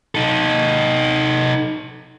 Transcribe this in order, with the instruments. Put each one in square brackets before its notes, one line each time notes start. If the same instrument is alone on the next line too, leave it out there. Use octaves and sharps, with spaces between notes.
[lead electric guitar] D#4 A4